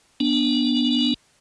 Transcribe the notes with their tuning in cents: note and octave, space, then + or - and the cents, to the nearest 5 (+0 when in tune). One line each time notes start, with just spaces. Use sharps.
B3 -25 D4 +0